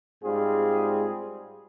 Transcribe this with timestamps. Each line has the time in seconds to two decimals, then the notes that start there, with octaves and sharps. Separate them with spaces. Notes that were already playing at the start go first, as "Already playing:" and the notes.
0.24 G#2 G3 C4 F4 G#4